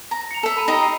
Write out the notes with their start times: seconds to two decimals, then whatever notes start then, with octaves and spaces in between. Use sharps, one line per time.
0.11 A#5
0.31 C#7 F7
0.43 A4 E5
0.56 A#5 B5 D#7
0.68 D#4 G4 D#5
0.82 C7